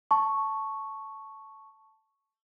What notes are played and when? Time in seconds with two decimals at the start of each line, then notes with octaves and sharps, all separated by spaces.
0.11 A5 C#6